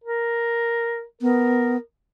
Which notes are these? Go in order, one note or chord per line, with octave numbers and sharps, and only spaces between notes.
A#4
B3 A#4